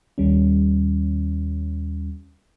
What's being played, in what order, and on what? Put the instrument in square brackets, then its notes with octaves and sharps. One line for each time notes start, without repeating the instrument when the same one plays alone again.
[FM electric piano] D#2 G3 C#4